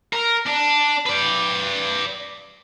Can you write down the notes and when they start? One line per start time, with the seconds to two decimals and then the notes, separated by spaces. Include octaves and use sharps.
0.13 A#4
0.47 D4
1.06 B4 D5